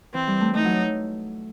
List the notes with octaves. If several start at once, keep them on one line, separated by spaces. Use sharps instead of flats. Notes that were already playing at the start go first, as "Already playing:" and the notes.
E3 C4
G3
A3
A3 D#4
F#3